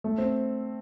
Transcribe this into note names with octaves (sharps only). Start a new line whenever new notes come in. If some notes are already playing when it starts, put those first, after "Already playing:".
A3
C4